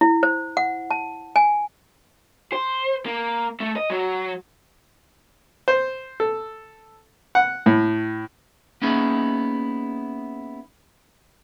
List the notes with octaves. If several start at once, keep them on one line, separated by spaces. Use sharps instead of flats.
E4
C5
F#5
A5
G#5
C5
A#3
A3
D#5
F#3
C5
A4
F#5
A2
A#3 B3 C#4 D#4 E4 G#4